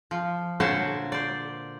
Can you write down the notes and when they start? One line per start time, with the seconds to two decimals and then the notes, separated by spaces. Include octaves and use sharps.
0.11 F3
0.60 A#2 D3 F#4 C5 C#5 A5
1.12 C5 D5